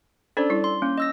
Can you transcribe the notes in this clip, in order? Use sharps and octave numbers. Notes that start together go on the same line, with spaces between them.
C#4 D4 A4 C5 D5
G3 E4
C6
A#3 C#4
D#5 E6 A#6